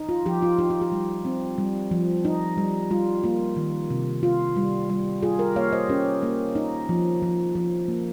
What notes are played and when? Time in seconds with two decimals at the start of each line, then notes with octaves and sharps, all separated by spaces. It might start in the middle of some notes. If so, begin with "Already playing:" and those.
Already playing: D#4
0.09 F4
0.26 F3 G4
0.42 F4
0.59 D#4 G4
0.70 F4
0.82 G4
0.92 G3
1.25 C4
1.58 G3
1.91 F3
2.25 D#4
2.58 G3
2.91 G3 F4
3.24 A#3 F4
3.57 D#3
3.90 C3
4.23 F4
4.56 G3
4.90 G3
5.23 F4 G#4
5.39 G4 A#4
5.56 A#3 C#5 F5
5.72 C5 D#5
5.89 C#4 G4 A#4
6.23 A#3
6.55 D#4
6.89 F3
7.22 F3
7.55 F3
7.88 A#3